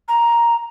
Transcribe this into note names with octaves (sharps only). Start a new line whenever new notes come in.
A#5